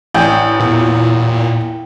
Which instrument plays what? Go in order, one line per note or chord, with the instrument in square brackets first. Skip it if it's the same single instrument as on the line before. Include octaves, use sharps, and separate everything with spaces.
[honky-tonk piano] A1 [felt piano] D5 G#5 [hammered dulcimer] G5
[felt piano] E2 [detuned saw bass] A#2